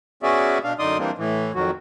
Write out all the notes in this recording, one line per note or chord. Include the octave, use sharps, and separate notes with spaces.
B3 C#4 F#4 G#4 D5 E5
B2 D4 F5
F#2 D3 D#4 D5 C6 D#6
E3 G3 A#3 C4 D4
A2 E3
F2 D#3 F#3 F#4